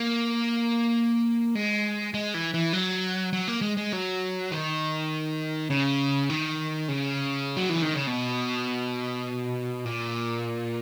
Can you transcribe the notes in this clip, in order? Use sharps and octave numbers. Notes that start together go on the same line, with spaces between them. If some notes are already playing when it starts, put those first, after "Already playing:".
Already playing: A#3
G#3
G#3
E3
E3
F#3
F#3
A#3
G#3
G#3
F#3
D#3
C#3
D#3
C#3
F#3
E3
D#3
C#3
B2
A#2